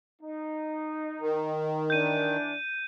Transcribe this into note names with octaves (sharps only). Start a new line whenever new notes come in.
D#4
D#3
E3 D4 G6 D#7